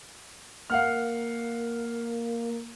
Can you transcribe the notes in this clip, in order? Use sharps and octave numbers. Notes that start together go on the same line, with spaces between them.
A#3 F5 F#5 F6